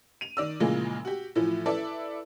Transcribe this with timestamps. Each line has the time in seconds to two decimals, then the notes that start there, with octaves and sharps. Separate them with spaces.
0.21 D#7 F7
0.37 D#3 D5 E6
0.60 A#2 C#3 E3 F3 G#3 A#3
1.05 F#4 G4
1.36 A2 E3 F3
1.66 E4 A4 B4 D5 E5